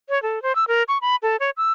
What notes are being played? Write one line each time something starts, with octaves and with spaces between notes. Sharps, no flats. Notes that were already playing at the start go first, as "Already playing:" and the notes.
C#5
A4
C5
E6
A#4
C#6
B5
A4
C#5
E6